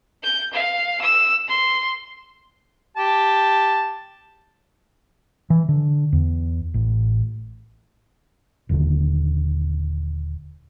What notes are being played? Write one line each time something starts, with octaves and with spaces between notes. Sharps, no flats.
G6
F5
E6
C6
G4 A5
E3
D3
E2
A1
D#1 D#2 D3